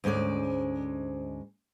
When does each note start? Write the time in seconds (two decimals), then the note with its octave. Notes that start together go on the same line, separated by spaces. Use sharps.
0.04 D2 G#2 G#3 C#4 D5